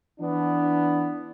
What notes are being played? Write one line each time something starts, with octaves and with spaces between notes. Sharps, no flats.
E3 B3 D4